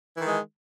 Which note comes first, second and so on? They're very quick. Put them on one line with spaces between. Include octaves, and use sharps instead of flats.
E3 D#3 G#3